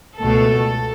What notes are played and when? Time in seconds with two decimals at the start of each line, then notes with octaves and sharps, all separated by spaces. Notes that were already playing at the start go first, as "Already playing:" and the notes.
0.21 C#2 B2 A3 A4